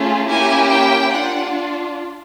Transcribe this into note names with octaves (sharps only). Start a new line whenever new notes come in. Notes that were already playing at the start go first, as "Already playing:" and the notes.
Already playing: A3 C#4 F4 G#4
A#3 C#4 E4 G4 G#5
G5
D4 F4 F#5